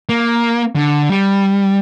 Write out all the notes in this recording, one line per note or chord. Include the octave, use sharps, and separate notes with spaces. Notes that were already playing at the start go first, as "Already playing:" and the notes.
A#3
D3
G3